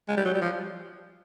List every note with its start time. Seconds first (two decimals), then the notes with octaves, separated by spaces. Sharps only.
0.08 G#3
0.17 G3
0.25 F#3
0.34 G3
0.41 F3